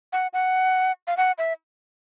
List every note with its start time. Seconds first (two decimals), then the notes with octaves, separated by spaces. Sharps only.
0.13 F#5
0.33 F#5
1.07 F5
1.17 F#5
1.38 E5